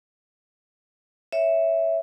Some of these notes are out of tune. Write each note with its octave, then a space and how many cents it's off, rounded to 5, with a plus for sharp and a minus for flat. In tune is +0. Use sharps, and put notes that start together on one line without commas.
C#5 +0 E5 +0